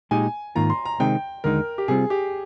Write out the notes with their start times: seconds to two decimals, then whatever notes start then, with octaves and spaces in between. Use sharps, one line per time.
0.11 A#2 G#3 D#4 G4 G#5
0.55 G#2 D#3 A#3 F4 A#5
0.70 C6
0.85 A#5
1.00 C3 D#3 G#3 C4 D#4 G5
1.44 D#2 D3 G#3 D#4 A#4
1.78 G4
1.88 C3 G3 C4 F4 G#4
2.10 G4